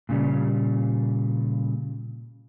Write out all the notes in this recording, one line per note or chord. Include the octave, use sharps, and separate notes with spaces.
A#2 C#3 G3